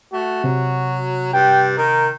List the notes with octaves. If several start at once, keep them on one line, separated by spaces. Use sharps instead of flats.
A3 F#4
C3 F#3
G2 G5
D#3 A#4